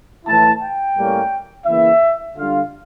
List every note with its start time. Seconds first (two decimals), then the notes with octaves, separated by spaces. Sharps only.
0.26 A2 E3 A3 E4 A5
0.61 G5
0.96 A2 G3 A#3 C#4
1.66 C#3 E3 A#3 E4 E5
2.36 D3 G3 D4 F4 F5